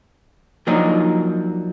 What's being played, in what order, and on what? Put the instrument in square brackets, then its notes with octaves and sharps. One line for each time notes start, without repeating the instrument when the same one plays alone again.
[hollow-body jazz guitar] F3 F#3 A#3 D4 D#4